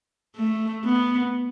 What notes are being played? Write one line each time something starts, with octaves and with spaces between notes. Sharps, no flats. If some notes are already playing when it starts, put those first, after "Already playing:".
A3
B3